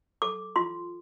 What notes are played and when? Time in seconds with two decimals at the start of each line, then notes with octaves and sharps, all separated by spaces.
0.22 A4 D6
0.56 F4 C6